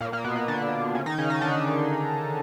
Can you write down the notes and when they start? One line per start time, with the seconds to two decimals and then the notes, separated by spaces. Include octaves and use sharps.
0.01 A#2 A#3
0.12 A#2 A#3
0.24 B2 B3
0.36 B2 B3
0.48 D3 D4
0.94 C#3 C#4
1.06 D#3 D#4
1.18 C#3 C#4
1.30 D#3 D#4
1.41 D3 D4